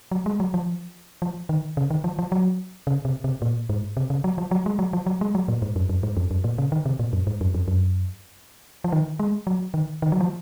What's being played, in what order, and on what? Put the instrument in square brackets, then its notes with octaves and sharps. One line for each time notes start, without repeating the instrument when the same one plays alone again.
[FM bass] F#3
G#3
F#3
F3
F3
D#3
C#3
D#3
F3
F3
F#3
C#3
C3
C3
A#2
G#2
C3
C#3
F#3
F3
F#3
G#3
F#3
F3
F#3
G#3
F#3
A#2
G#2
F#2
F#2
G#2
F2
F#2
A#2
C#3
D#3
C3
A#2
F#2
G#2
F#2
F2
F#2
F3
D#3
G#3
F#3
D#3
D#3
F#3
F3